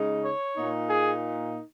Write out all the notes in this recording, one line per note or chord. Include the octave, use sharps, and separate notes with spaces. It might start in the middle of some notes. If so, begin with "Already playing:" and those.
Already playing: C#3 G#3 D#4
C#5
A#2 A#3 D#4
G#4